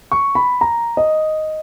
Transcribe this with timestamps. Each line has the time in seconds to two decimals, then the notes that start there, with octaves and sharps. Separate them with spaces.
0.12 C#6
0.35 B5
0.61 A#5
0.97 D#5